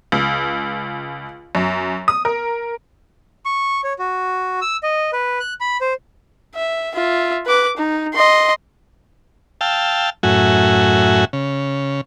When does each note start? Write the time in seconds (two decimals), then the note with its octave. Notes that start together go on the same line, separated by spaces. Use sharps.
0.12 C#2
1.55 F#2
2.08 D#6
2.25 A#4
3.46 C#6
3.84 C#5
3.99 F#4
4.61 E6
4.83 D#5
5.13 B4
5.40 F#6
5.61 B5
5.81 C5
6.55 E5
6.95 F4 E5
7.46 B4 D6
7.77 D#4
8.15 D#5 C6
9.61 F5 G5 A5 E6
10.23 F#2 A2 F#4 E5 G#5
11.33 C#3